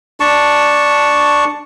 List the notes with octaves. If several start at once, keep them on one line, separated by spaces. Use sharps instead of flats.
D4 A5 C#6